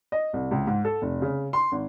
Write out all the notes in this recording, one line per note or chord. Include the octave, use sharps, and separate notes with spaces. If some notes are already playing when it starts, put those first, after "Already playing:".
D#5
C2
C#2
G#2
A4
F1
C#3
C6
G#1